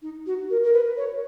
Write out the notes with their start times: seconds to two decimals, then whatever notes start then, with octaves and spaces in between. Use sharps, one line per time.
0.02 D#4
0.26 F#4
0.50 A#4
0.63 A#4
0.73 B4
0.97 C#5